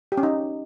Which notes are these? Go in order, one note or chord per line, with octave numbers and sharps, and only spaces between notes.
G4
C#4
D#4